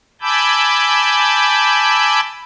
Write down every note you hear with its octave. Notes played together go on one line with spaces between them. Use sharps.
G#5 A5 B5 D6 E6 G6